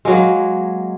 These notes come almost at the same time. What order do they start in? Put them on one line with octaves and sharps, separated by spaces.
G#3 F#3 A#3